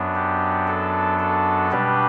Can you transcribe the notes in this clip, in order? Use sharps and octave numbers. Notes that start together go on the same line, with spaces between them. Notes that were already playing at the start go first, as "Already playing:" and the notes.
Already playing: F#2 F#3 B3 D4
G4
A4
A4
B2 G3 D4 G4 B4